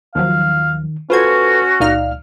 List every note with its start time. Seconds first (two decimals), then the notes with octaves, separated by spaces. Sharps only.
0.15 D#2 D#3 F3 F#3 F5
1.10 C#4 F4 F#4 A4 B4 C5 G#6
1.80 C#2 A#2 D#4 D5 F5 F6